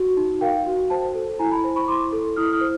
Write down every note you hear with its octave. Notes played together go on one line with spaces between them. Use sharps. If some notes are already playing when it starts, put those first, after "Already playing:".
Already playing: F#4
D#4
A#4 F5 G5
F#4
C5 G5 A5
A4
E4 G#5 A#5
A5 B5
C5
B5 C#6
E4 C6 D6
A4
E4 D#6 F6
D#6 F6
C5